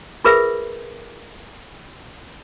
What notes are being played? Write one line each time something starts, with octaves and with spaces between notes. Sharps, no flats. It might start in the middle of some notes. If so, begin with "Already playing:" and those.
F4 G#4 A#4 B4 E5